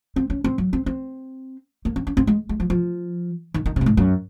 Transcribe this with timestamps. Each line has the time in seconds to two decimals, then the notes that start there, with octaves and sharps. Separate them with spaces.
0.16 C4
0.30 C#4
0.44 C4
0.58 F#3
0.73 C4
0.86 C4
1.85 A#3
1.96 C4
2.07 C#4
2.17 C4
2.27 G#3
2.49 G#3
2.60 F3
2.70 F3
3.54 D#3
3.66 D#3
3.76 C3
3.81 F#2
3.86 G#2
3.97 F#2